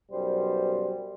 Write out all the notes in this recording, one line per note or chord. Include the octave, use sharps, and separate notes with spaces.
B1 F#2 G3 C5